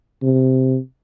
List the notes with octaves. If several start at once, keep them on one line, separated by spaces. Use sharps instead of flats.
C3